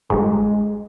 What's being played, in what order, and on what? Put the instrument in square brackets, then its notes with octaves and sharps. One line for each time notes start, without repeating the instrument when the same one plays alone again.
[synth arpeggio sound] G1 G#2 [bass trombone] G#3